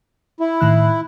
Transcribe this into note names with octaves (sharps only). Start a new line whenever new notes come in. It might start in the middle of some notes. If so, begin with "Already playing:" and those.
E4
A2 D#3 F#6